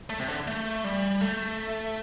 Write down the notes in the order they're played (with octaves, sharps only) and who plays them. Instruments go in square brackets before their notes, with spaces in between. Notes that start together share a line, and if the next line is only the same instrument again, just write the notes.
[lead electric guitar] A3
C3
D3
A3
G3
A3